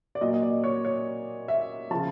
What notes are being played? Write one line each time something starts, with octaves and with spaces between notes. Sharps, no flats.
D5
A#2 F#3 D#5
D#5
D5
C#5
C#5
E5
C#3 F3 A5